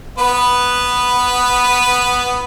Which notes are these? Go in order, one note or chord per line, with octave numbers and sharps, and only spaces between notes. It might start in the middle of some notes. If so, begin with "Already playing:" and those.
B3 B4